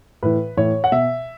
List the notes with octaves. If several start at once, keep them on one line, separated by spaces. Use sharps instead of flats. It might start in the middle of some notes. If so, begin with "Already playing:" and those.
A2 E3 B4
A2 E3 C#5
F#5
B2 E5